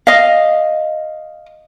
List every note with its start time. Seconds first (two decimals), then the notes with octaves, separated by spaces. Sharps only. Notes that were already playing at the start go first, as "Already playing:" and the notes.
0.07 D#5 F5